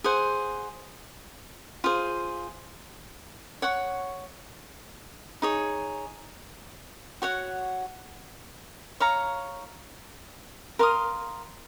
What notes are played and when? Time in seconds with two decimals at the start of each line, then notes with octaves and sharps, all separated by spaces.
0.04 G#4 C5 F#5
1.84 F4 G#4 C5
3.62 C#5 F#5 C#6
5.42 D#4 G#4 C#5
7.22 F#4 C#5 F#5
9.00 C#5 F5 A#5 C#6
10.79 A#4 F5 C6 D#6